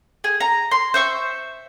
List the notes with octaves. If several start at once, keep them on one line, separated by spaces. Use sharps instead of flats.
G#4
A#5
C6
C5 E5 C#6